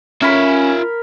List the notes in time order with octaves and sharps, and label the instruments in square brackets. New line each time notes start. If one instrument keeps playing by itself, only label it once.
[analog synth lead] C#4 [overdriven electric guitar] F4 E5 [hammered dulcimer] A#4 B5